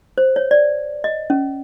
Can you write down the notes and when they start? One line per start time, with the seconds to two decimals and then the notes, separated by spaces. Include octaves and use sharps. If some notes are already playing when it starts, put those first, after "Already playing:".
0.18 C5
0.36 C#5
0.51 D5
1.04 D#5
1.30 C#4